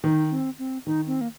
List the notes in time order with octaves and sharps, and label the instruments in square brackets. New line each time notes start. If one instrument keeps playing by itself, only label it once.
[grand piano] D#3 [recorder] D#4
[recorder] C4
C4
[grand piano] D#3 [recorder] D#4
[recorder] C4
A#3